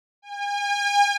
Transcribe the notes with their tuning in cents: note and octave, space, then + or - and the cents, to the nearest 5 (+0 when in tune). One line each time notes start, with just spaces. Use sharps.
G#5 -40